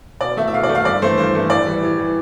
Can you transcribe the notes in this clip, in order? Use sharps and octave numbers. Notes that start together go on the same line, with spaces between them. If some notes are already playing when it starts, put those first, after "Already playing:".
B2 D5
A3 E5
E5
B2 F5
D5
A3
F5
G2 D5
E3 A3 C5
G2 C5
E3 A3
A2 D5
E3 G3
A2
E3 G3